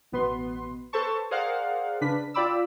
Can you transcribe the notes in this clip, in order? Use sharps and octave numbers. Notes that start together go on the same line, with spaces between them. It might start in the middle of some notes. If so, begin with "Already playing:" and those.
A1 B2 B3 B4 C6
A4 B4 C5 A5 C#6
G#4 A#4 C5 D5 F5 F#5
C#3 D4 B4 B6
F4 D5 G5 B5 D6 E6